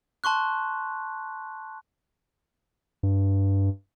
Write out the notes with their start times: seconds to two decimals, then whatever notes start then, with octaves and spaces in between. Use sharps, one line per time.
0.24 A5 C6 C#6 F#6
3.03 G2